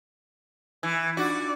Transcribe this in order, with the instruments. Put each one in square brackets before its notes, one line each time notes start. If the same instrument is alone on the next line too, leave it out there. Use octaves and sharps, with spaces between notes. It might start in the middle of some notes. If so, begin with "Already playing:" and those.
[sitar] E3
[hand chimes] D4 D#4 F4 [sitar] F#4 [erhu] D5